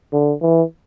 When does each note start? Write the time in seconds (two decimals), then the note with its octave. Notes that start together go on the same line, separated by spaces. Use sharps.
0.13 D3
0.41 E3